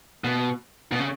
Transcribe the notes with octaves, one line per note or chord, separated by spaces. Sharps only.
B2
B2
C#3